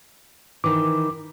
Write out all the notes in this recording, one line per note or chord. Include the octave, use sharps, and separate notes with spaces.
D#3 E3 D6